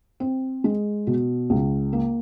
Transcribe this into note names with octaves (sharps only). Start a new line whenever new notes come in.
C4
G#3
B2
C#2
A#3